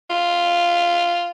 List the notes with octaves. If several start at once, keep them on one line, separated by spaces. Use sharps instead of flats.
F4